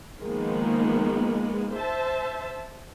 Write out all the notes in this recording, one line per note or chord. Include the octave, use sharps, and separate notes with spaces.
D#3 F3 G#3 A#3 B3
C5 E5 A5